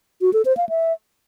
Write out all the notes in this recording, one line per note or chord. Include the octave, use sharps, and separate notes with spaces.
F#4
A4
C5
F5
E5